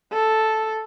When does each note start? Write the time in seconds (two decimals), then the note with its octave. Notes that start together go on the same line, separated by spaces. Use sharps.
0.13 A4